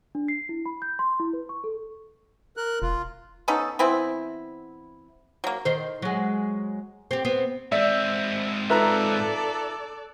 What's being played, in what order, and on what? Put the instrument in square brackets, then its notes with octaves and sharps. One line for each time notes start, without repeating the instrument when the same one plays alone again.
[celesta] D4
C7
E4
B5
G6
C6
E4
B4
C#6
A4
[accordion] A#4 F#6
[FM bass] E1 [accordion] F4
[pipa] B3 C#4 D#4 A4
E3 B3 C4 E4
F#3 A#3
[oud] D#3 C5
F#3 G#3
C4 G4
B3 C4
[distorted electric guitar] G#2 C4 [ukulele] D5 [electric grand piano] E5
[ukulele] D#4 F4 B4 [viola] A4 D5 [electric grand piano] E5 A#5 F#6